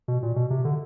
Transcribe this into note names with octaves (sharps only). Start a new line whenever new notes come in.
B2
A#2
B2
C3
D3